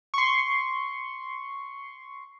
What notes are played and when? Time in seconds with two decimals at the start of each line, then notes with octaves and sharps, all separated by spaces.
0.14 C6 C#6